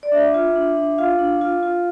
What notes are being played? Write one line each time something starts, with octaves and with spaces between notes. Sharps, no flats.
D5
D4 E5
F4
D4
D4
F4 F5
D4
F4
F4